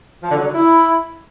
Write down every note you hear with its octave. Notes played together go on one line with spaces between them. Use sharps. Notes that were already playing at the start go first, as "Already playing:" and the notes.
F3
D3
F#3
D3
E4